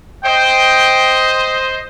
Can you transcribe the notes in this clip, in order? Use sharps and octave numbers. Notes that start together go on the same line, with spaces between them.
C5 D#5 G5